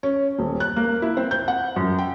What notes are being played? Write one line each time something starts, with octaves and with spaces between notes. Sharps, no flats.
C#4
D#1
F#6
A#3
E4
C4
G6
F#5
F#2
G5